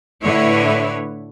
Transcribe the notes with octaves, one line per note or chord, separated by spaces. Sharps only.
A2 D3 E4 B4 C#5